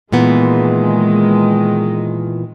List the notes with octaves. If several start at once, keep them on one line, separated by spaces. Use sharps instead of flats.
A#2 D#3 E3 G#3 B3